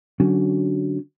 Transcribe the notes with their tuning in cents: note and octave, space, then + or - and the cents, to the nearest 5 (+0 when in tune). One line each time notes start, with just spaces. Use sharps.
D3 +0 F#3 +15 C#4 +0